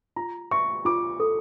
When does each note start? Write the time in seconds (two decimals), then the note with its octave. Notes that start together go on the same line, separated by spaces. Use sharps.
0.16 F4 A#5
0.51 E5 C#6
0.85 F4 D6
1.20 A4